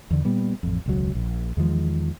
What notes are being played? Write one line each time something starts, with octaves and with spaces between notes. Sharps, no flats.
E2 D3
A#2 G3 B3
A1 F2
E1 C#2 F#3
A#1
E2 D#3 F3 G#3